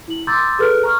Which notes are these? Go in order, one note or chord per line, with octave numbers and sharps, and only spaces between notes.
E4 F#7
A#5 C6 D6 E6 G6 A6
G#4 A4 B4 F6 F#6
A#5 C#6 F6